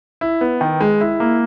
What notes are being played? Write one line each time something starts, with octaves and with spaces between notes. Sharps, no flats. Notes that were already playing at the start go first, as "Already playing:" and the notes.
E4
B3
D#3
G#3
E4
A#3